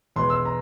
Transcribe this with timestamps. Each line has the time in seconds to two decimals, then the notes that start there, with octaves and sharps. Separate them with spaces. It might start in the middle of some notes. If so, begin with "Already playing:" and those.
0.16 E2 B2 G#3 C6
0.30 E6
0.45 A#5